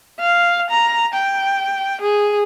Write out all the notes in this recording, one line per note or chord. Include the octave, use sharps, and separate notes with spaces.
F5
A#5
G5
G#4